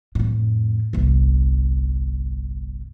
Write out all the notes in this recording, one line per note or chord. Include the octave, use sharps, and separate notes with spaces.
F2 A2
G1 C2